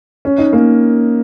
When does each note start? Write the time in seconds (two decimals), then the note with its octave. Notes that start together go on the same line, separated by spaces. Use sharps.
0.25 C#4
0.38 D#4
0.52 A#3 C#4